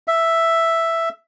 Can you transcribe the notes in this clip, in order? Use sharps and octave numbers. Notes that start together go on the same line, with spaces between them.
E5